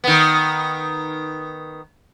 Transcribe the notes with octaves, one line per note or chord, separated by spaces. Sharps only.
D#3 B3